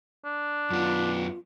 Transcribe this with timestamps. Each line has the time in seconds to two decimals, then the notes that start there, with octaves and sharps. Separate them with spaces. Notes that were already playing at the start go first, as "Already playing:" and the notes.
0.25 D4
0.71 F#2 B3 F4